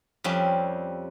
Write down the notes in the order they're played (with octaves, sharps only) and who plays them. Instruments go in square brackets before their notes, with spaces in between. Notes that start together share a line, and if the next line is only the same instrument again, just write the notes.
[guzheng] F2 G3 C4 C#4